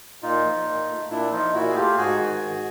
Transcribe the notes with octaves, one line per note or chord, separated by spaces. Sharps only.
A#2 D#4 F4
F3
A#2
A3
A#2 D4 E4
F3 D#4 F4
A#2 E4 F#4
G#4
A3 F4 G4
G#2 F#4 G#4
D#3
G#2